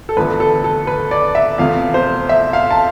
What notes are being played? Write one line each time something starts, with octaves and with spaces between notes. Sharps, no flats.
A4
E2 D3 F3 A3 B4
A4
A4
B4
D5
E5
E2 C3 F3 A3 F5
C5
E5
F5
A5